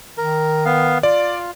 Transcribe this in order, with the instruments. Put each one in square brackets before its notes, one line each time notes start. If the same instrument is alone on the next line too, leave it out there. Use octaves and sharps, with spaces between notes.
[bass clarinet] D#3 [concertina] A#4
[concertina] B3 F5
[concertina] F4 [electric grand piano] D5